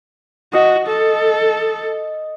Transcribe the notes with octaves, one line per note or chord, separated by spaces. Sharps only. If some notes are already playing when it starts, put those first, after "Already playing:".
F#4 D#5
A4